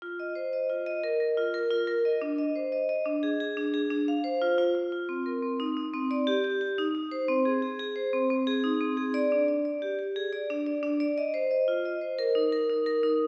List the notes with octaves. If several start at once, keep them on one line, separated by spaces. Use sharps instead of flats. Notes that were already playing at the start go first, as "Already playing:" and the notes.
F4
D#5
C5
D#5
F4
D#5
A#4
A#4
F4
A#4
F4
A#4
D#5
D4
D#5
C5
D#5
D#5
D4
G#4
G#4
D4
G#4
D4
F5
C5
F4
F4
F4
F4
C4
A#4
C4
D#4
D#4
C4
D5
G4
G4
G4
D#4
D#4
C5
C4
G#4
G#4
G#4
C5
C4
C4
G#4
D#4
C4
G#4
D5
D4
D5
D5
G4
G4
G#4
D5
D4
D5
D4
D5
D#5
C5
D#5
F4
D#5
C5
A#4
D#4
A#4
D#4
A#4
D#4